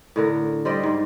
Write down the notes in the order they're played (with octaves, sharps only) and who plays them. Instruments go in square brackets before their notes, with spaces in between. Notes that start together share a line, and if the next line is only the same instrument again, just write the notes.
[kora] A2 D3 A#4
G3 C5 D5 D#5
G#2